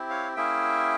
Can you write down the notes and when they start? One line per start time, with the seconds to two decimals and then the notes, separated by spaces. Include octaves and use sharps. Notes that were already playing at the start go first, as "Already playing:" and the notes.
Already playing: C4 E4 G4
0.10 C#5 F5
0.35 A#3 C#4 E4 G#4 E5 G5